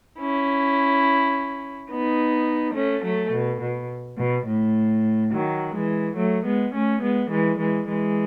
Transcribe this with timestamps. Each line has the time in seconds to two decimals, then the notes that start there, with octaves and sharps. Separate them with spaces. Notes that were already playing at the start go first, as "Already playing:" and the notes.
0.20 C#4 E4
1.90 B3 D#4
2.75 A3 C#4
3.04 F#3 A3
3.33 B2
3.61 B2
4.18 B2
4.46 A2
5.32 D#3 F#3
5.74 E3 G#3
6.16 F#3 A3
6.45 G#3 B3
6.74 A3 C#4
7.03 G#3 B3
7.31 E3 G#3
7.59 E3 G#3
7.87 E3 G#3